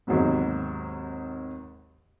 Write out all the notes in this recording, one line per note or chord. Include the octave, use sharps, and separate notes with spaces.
D#2 G#2 C3 F#3 B3